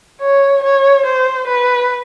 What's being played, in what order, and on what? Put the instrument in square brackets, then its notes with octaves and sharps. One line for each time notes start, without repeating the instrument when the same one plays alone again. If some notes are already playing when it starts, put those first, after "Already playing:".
[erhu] C#5
C#5
C5
B4